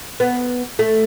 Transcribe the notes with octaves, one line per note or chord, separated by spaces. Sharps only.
B3
A3